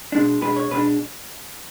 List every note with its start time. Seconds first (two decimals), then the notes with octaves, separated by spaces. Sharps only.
0.12 B2 G#3 D4
0.42 B2 G#3 D4 B4
0.56 C#5
0.71 B2 G#3 D4 B4